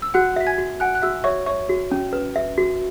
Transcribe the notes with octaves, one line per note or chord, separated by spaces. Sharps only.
E6
F#4 F#5 F#6
E5 B6
G#5 G#6
F#4
F#5 G#5 F#6
F#6
F#4 E5 E6
C#5 E5 C#6
C#5 E5 C#6
F#4
C#4
B4
E5
F#4